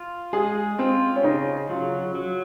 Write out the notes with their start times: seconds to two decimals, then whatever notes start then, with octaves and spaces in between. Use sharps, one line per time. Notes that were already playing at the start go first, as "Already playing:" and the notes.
Already playing: F4
0.33 G#3 G#4
0.78 C4 F4
1.16 C#4
1.24 C#3 D#4
1.69 F#3 F4
2.15 F#3